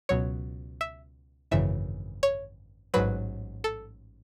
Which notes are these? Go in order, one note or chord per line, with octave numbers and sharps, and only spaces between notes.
C#2 B2 F#3 C#5
E5
G#1 F#2 C#3 E3 E5
C#5
A1 G#2 F#3 B4
A4